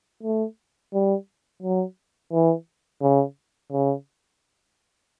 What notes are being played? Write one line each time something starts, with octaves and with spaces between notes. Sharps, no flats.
A3
G3
F#3
E3
C#3
C#3